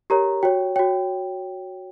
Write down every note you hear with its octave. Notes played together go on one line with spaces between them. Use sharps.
G4 A#4 C#5 A#5
F#4 C#5 G5
F#4 C#5 G5